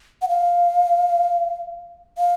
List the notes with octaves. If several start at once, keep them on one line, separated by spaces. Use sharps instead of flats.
F#5
F5
F5